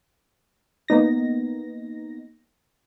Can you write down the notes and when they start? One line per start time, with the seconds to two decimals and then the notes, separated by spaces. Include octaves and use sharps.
0.88 A#3 B3 D#4 A#6